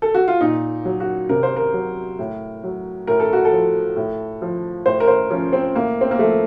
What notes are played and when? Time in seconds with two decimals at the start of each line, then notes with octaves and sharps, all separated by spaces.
0.02 A4
0.14 F#4
0.28 F4
0.41 A#2 D#4
0.85 F#3
1.00 F#4
1.29 C3 A#4
1.43 C5
1.56 A#4
1.74 F#3
2.19 A2
2.64 F#3
3.07 A2 A#4
3.20 A4
3.33 F#4
3.45 A4
3.52 F3
3.96 A2
4.42 F3
4.86 A2 C5
5.00 A#4
5.08 C5
5.30 F3 C#4
5.53 C4
5.75 A2 A#3
6.01 C4
6.11 A#3
6.19 F3 A3